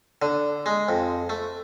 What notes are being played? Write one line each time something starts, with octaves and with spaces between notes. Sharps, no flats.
D3
G#3
F2
A3